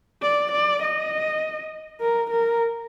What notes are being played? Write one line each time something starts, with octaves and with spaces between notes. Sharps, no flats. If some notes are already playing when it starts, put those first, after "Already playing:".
D5
D5
D#5
A#4
A#4